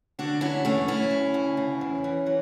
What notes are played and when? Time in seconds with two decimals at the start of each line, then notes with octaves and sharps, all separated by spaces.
0.19 D3 D4 F#4
0.41 F#3 C#4 E4
0.65 E2 A3 C#4
0.88 D2 C#4 E4
1.11 D2
1.34 D2
1.57 C#3
1.81 E2
2.04 E3
2.26 F#3